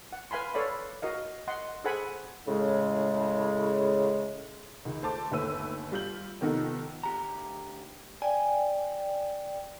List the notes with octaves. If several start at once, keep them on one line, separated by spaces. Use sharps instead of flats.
F#5
B4 F5 G#5 B5 C6
A4 B4 C#5 D5 F5 B5
F#4 A#4 D#5 F5
D#5 F#5 C6
G#4 A4 C5 F#5 G#5 B5
A2 C#3 G#3
C#2 D#3
A3 C5 A5 D6
G1 D#2 A3 B4 E6 D#7
G3 F4 G6 F#7
C3 D#3 F3 B3 D#4 A4
D2 G4 A#5
D5 G5 G#5